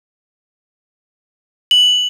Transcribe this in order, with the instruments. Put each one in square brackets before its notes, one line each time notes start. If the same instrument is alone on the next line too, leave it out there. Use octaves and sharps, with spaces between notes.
[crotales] F#7